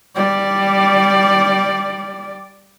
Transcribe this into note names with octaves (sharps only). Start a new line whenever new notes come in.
G3 D5